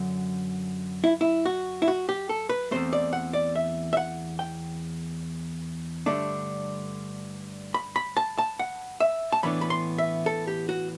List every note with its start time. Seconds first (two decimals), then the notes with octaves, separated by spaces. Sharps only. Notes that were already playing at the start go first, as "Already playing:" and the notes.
Already playing: F#2 D3 F#3
1.04 E4
1.21 E4
1.45 F#4
1.82 E4
1.88 F#4
2.09 G4
2.29 A4
2.49 B4
2.71 E2 B2 A3 C4 C5
2.93 D5
3.13 F#5
3.33 D5
3.55 E5
3.93 E5
3.97 F#5
4.39 G5
6.06 G2 D3 A3 D4
7.74 B5
7.96 B5
8.17 A5
8.38 A5
8.59 F#5
9.00 E5
9.32 A5
9.43 A2 E3 B3 D4 B5
9.61 B5
9.70 C6
9.98 E5
10.26 A4
10.48 G4
10.69 F#4